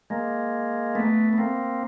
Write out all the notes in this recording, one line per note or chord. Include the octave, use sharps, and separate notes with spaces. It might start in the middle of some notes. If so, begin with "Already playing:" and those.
G#3 A#3
A3 B3
B3
A#3 C4